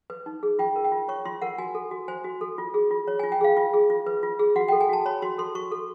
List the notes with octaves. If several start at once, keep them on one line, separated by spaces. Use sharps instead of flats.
B4
D#4
G#4
F4 G5
A#4
G5
F4
C#5 C#6
F4 C6
A#4 F#5
F#4 G#5
A4
F#4
C5 G#5
F#4
A4
F4
G#4
F4
C#5
G#5
F4
G5
G#4 F5
F4
G#4
F4
B4
F4
G#4
F#4 F#5
G5
A4
G#5
F#4 A5
C#5 B5
F#4 C6
A4 C6
F#4 C#6
A4